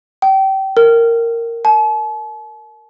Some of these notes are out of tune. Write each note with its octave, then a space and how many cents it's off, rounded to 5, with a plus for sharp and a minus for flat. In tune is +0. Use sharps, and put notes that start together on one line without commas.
G5 -25
A#4 -10
A5 -45